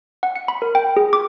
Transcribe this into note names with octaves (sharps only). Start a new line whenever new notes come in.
F#5
C#7
B5
A#4
G5
G#4
D6